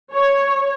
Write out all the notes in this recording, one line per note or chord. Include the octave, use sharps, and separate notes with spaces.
C#5